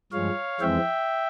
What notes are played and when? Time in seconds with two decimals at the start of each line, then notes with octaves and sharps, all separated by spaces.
0.12 G2 F3 G#3 C#5 F5
0.61 F2 E3 G#3 C4 E5 G5